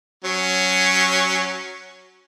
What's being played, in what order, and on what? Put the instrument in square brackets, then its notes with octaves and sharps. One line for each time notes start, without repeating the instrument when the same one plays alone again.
[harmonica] F#3 C#4